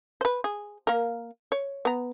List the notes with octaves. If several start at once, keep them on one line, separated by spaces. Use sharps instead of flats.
B4 C5
G#4
A#3 A#4
C#5
B3 A#5